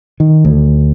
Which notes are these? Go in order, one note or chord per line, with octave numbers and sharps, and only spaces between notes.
D#3
D2